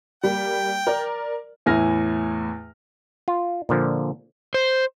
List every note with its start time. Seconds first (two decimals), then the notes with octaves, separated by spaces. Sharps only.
0.23 G3 A#3 G5
0.87 A#4 D5
1.66 E2 A2 E4 G#5 F6 A#6
3.28 F4
3.69 A#2 D3 F3
4.54 C5